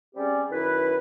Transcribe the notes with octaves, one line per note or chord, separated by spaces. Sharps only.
G3 C4 C#4 G4 G#4 D5
F#2 D#3 E4 B4